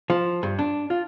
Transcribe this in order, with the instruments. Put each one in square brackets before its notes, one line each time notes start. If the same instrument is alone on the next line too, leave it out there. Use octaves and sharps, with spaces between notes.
[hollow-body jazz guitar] F3
G2
D4
F4